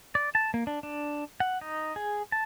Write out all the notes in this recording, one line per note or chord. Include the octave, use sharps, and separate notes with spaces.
D5
A5
A#3
D4
D4
F#5
D#4
G#4
A5